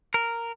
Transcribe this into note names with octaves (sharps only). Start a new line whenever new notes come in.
A#4